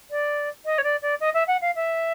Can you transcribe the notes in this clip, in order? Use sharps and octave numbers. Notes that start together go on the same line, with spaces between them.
D5
D#5
C#5
D5
D5
D#5
E5
F#5
F5
E5